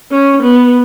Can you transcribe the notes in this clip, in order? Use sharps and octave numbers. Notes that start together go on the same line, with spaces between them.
C#4
B3